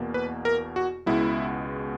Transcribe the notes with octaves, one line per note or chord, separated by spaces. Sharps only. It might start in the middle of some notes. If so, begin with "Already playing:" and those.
Already playing: E2 B2 A#3
B4
A#4
F#4
C#2 B2 G#3 B3 E4